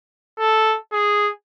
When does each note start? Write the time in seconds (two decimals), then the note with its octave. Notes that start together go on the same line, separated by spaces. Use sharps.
0.39 A4
0.93 G#4